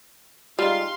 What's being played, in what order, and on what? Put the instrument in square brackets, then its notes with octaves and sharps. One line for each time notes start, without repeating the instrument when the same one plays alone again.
[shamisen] G3 [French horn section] G#3 D#4 [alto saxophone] F4 [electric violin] F5 C6